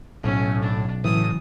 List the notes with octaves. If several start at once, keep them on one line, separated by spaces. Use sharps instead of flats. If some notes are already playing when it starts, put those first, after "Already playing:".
B1 A2 C#4
D4
A2 C#3 E3 F#3 D#6